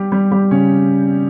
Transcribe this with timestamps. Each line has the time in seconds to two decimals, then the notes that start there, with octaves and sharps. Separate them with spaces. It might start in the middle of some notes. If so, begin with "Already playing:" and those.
Already playing: G3 G4
0.12 G3 G4
0.31 G3 G4
0.51 C#3 C#4